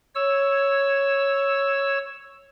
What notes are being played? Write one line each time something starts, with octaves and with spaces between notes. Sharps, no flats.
C#5 E6